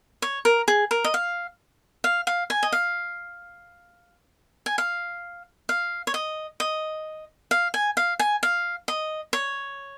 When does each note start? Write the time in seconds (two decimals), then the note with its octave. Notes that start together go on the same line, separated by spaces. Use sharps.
0.22 C#5
0.45 A#4
0.68 G#4
0.91 A#4
1.04 D#5
1.14 F5
2.04 F5
2.27 F5
2.50 G#5
2.63 D#5
2.72 F5
4.66 G#5
4.78 F5
5.69 F5
6.07 C#5
6.14 D#5
6.60 D#5
7.51 F5
7.74 G#5
7.97 F5
8.19 G#5
8.43 F5
8.88 D#5
9.33 C#5